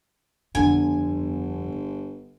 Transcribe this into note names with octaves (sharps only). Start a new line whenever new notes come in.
G1 F2 B2 D3 G#5